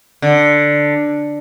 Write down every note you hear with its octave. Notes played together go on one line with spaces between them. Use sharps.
D3